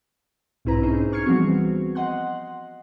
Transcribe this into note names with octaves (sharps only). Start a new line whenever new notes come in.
B1 G#2 C4 E4 B4 A#5
C#4 D#4 G#4 C5
C#6 F6 G#6 C7 C#7
E3 F3 G3 B3 C4 F#4
D#5 F#5 C6 F#6